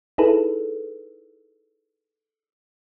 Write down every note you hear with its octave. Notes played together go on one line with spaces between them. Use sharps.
D#4 E4 G#4 A4 B4